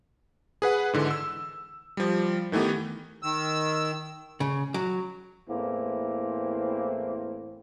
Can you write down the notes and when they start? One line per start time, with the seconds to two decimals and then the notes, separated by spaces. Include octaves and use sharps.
0.62 G#4 B4 F#5
0.93 G#2 D3 E3
1.11 E6
1.97 F3 G3
2.52 D#3 E3 A3 B3 G4
3.23 D#3 E6
4.40 C#3
4.74 F#3
5.49 E2 A2 E3 A#3 C4